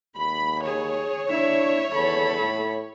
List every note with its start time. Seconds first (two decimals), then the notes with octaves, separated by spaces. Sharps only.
0.18 D#2 B5
0.66 G#4 C#5
1.30 D4 E4 E5
1.94 E2 A4 B5
2.41 A2